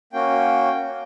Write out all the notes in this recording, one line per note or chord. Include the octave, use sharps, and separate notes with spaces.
A#3 C#4 F#4 G5
A#3 C#4 F#4